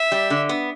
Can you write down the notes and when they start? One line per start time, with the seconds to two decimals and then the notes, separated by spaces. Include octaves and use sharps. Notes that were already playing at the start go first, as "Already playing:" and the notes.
Already playing: E5
0.12 G3
0.30 D3
0.49 B3